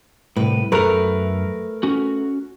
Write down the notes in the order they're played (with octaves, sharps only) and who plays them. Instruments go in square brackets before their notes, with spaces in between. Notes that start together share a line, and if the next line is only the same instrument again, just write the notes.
[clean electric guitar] C2 A2 [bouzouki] B4
[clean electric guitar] F#2 A#5 [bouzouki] A3 A#4 B4
[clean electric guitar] C#4 F#4